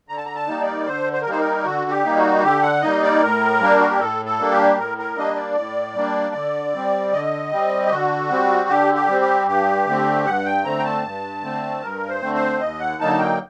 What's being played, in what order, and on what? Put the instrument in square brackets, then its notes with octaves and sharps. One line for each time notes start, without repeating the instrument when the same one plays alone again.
[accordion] D3 A#5
A5
A#5
A5
G3 A#3 D#4
D5
D3 C5
C5
A#4
G3 A#3 D#4 C5
A#4
D3 F#4
G4
G3 A#3 D#4
F#4
D3 G4
F#5
G3 A#3 D#4 D#5
D5
A2 A#4
G3 A#3 D4
F#4
G4
A2 A4
A4
G3 A#3 D4
G4
A2 A#4
A#4
G3 A#3 D4 D#5
D5
A2
G3 A#3 D4
D3
G3 C4
D3 D#5
G3 C4
G4
D3 F#4
G3 C4
D3 G4
G4
G3 C4
G4
G2 G4
D3 A3 C4
G2 F#5
G5
D3 A3 C4 A#5
G5
A5
G2
D3 A3 C4
G2 A#4
C5
D3 A3 C4
C5
D#2 D#5
F#5
D3 F#3 A#3 D#4 A5
G5